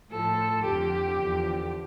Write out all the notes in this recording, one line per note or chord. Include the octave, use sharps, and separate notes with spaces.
A2 F3 A4
F2 D3 F3 G4
E2 D3 F3